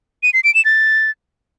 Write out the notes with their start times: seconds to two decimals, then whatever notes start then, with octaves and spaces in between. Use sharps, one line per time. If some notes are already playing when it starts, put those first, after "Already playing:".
0.23 D#7
0.34 C7
0.44 D7
0.54 E7
0.65 A6